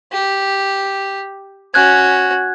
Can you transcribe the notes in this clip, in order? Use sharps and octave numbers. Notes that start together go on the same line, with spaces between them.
G4
C#4 F#4 F#6 G#6